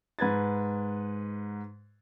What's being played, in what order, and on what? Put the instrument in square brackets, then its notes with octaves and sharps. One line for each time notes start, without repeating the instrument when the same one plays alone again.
[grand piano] G#2 B4 G#6 A6